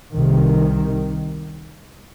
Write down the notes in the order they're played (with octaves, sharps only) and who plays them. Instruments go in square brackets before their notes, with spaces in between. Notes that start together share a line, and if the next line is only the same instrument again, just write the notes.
[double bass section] C2 C3 D#3